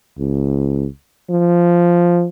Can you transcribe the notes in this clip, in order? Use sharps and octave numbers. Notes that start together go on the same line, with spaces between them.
C#2
F3